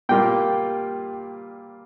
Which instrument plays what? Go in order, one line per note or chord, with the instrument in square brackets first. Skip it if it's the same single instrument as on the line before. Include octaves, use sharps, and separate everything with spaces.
[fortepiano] A#2 G3 A#3 F4 [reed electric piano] G5